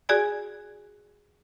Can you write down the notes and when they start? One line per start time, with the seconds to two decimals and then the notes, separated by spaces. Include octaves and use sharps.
0.09 F#4 G#4 D5 G#5